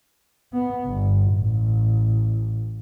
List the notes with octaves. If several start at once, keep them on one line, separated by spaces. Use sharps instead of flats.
B3
G1
A1